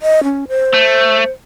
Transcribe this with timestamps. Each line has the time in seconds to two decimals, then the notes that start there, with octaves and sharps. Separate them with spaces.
0.02 D#5
0.24 C#4
0.48 C5
0.74 A3